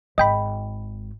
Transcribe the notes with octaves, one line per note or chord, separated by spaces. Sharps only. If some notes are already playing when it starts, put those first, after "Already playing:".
G#1 D#5 G5 B5